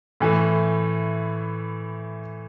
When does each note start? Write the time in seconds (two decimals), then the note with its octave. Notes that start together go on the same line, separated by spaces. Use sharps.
0.20 A2 E3 A3